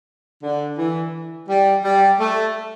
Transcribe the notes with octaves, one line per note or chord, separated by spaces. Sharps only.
D3
E3
G3
G3
A3